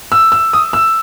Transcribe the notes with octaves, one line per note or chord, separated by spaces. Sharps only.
E6
E6
D#6
E6